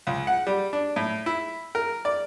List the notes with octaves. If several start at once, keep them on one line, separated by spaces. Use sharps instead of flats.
C#2
F#5
G3
D4
A2
E4
A#4
D5